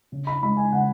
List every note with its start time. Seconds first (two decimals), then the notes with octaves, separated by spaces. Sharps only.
0.12 C#3
0.27 B5
0.42 G#3 B5
0.57 G#5
0.72 C#3 F#5